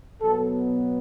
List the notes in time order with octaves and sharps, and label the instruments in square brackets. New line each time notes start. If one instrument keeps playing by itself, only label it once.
[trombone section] B2 F#3 B3 A4